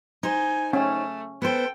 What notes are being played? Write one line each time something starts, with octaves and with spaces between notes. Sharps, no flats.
D#4 C5 G#5
A3 C#4
B3 A4 C5 G5